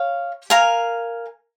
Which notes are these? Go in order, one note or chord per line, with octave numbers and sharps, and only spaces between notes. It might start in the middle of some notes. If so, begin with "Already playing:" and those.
Already playing: C#5 F5
A#4 F5 G#5